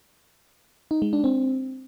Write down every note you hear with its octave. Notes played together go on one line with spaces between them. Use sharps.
D#4
G#3
D4
C4